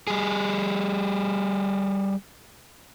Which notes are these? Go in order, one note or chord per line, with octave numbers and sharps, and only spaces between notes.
G3 G#4